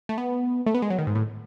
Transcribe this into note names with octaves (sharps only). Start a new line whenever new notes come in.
A3
B3
A3
B3
G#3
F#3
D#3
G#2
A2